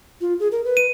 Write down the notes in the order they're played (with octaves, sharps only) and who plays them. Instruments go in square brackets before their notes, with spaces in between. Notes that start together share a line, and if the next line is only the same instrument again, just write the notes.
[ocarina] F4
G#4
A#4
B4
[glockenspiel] D#7